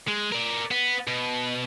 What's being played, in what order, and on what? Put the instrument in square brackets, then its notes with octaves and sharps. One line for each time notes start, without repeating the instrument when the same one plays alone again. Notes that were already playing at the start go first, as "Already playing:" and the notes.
[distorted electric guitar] G#3
A#4 D5
B3
B2